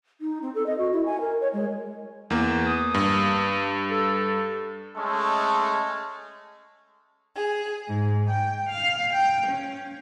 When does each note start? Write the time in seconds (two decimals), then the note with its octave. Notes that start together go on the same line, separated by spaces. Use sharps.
0.21 D#4
0.42 C4
0.55 A4
0.66 D#5
0.78 F#4
0.93 E4
1.06 G#5
1.21 A#4
1.41 C#5
1.53 G#3
2.30 E2 A#3
2.66 D#6
2.94 G2
3.91 A4
4.96 G#3 A3 C#4 A4
7.36 G#4
7.87 G#2
8.29 G5
8.69 F5
9.14 G5
9.46 C#4